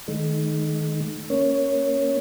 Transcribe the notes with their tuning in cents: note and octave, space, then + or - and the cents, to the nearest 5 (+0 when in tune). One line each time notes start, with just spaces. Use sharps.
D#3 +0 A3 -45 D#4 -10
A#3 +0 C#4 +0 C#5 +0